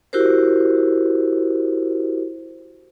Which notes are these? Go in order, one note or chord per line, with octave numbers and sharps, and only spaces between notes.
E4 F#4 G4 A#4 C5